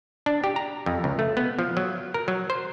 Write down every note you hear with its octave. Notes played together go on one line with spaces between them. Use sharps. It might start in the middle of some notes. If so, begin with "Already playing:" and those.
D4
G4
A#5
F2
C#2
A3
B3
F3
F#3
A#4
F#3
C5